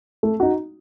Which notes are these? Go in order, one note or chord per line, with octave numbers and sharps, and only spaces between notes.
A3
D#4 F#4